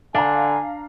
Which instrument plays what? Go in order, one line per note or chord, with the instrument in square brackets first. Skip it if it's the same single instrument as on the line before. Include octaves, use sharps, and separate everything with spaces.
[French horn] D3 [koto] D4 [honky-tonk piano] F5 A#5 [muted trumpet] G#5